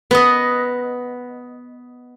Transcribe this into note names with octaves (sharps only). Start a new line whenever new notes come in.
B3 D#5